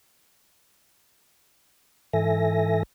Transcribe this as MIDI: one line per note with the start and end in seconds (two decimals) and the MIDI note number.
2.13 2.83 44
2.13 2.83 52
2.13 2.83 69
2.13 2.83 76
2.13 2.83 80
2.13 2.83 94